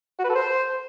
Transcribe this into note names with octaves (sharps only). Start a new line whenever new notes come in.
F#4
B4
A4
C5